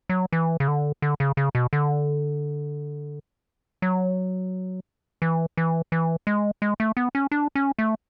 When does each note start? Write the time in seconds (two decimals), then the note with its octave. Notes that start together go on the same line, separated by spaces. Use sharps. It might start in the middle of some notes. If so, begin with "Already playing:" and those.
0.09 F#3
0.32 E3
0.60 C#3
0.68 D3
1.02 D3
1.20 C#3
1.37 C#3
1.55 B2
1.73 D3
3.82 F#3
5.22 E3
5.57 E3
5.92 E3
6.27 G#3
6.62 G#3
6.80 A3
6.97 B3
7.15 C#4
7.31 D4
7.55 C#4
7.79 A3